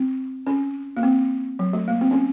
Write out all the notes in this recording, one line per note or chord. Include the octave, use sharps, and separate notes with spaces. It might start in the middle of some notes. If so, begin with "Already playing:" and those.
Already playing: C4
C#4
A#3
C4
F#3
A3
A#3
C4
C#4